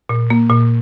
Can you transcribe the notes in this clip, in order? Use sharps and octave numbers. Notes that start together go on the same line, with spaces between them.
A#2
A#3
A#2